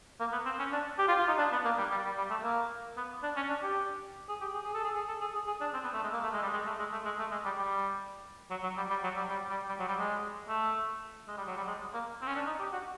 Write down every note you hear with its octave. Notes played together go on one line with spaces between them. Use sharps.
A#3
B3
C4
C#4
D4
G4
F4
F4
D#4
D4
B3
A#3
G3
G3
G3
G3
A3
A#3
B3
D4
C#4
D4
G4
G#4
G4
G#4
G#4
A4
G#4
G#4
A4
G#4
G#4
G#4
D4
C4
B3
A3
G#3
A#3
A3
G#3
G3
G#3
A3
G#3
A3
G#3
A3
G#3
G3
G3
F#3
F#3
G3
G3
F#3
G3
G3
G3
G3
F#3
G3
G#3
A3
G#3
G3
F#3
G3
G#3
A#3
C4
C#4
D4
D#4
G4
F#4